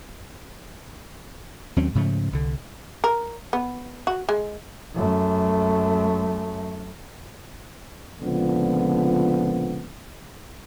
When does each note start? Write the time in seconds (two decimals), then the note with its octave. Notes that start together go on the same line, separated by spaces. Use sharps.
1.76 D#2 F#3 C4 C#4
1.95 G#2 C#3 F3 A3
2.33 C2 D3
3.04 A#4
3.53 B3
4.07 F#4
4.29 G#3
4.95 F#2 A3
8.21 C#2 A#2 D3 F3 B3